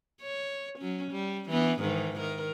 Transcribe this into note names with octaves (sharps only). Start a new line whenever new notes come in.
C#5
F#3 C#4
G3
E3 B3 D4
G#2 D#3 E3
D#3 A#4